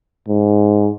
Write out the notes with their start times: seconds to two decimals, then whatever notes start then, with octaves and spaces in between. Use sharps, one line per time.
0.28 G#2